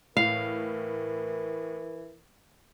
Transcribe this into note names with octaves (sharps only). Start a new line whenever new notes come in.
A2 E3 A#4 F5